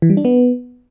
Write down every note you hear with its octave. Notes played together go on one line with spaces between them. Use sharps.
E3
G3
D4
B3